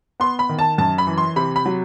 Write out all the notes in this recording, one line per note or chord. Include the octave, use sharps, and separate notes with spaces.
B3 C6
B5
D#3
A5
F#2 A5
B5
E3
C6
C3 B5
B5
F#3